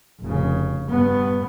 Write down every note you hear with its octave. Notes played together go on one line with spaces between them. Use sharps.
F1 C#3
G2 B3